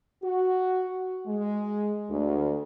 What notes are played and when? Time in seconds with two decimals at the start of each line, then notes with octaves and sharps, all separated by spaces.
0.22 F#4
1.27 G#3
2.09 D2